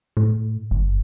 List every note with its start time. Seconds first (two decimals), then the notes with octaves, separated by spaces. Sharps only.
0.17 A2
0.71 G1